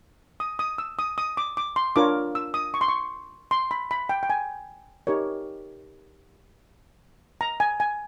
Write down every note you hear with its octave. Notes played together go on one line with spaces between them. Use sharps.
D#6
D#6
E6
D#6
D#6
D6
D6
C6
D4 F4 A#4 C#5 D6
E6
D#6
C#6
C6
C#6
C6
B5
B5
G5
G5
G#5
D#4 G4 A#4 C#5
A#5
G#5
G#5